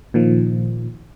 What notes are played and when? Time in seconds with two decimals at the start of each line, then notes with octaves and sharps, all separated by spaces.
0.14 A#2 D#3 F3